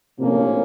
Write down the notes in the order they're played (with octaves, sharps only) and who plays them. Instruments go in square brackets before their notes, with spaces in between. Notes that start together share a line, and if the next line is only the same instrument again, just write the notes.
[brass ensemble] A#1 A2 F3 A#3 C#4 [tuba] C3